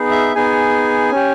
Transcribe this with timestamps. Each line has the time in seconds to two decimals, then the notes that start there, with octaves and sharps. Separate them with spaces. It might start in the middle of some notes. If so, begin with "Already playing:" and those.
Already playing: B3 D#4 G#4
0.11 E5
0.35 B3 D#4 G#4 G#5
1.11 C#4 G4